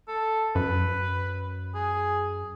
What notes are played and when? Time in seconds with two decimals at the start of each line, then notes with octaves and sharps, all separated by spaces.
0.08 A4
0.55 F#2 B4
1.75 G#4